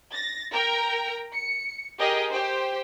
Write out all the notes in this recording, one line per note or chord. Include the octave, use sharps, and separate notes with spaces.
A6 A#6
A#4 G5 A#5
C#7
G4 G#4 A#4 D#5 G5
G4 C5 G5